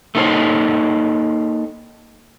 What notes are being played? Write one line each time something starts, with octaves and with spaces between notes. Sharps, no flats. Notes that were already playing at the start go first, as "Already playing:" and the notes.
A3 A#3 D#4 A4 C5 C#5